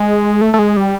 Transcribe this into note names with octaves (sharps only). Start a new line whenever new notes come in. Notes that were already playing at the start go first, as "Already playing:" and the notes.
Already playing: G#3
A3
A3
G#3
G3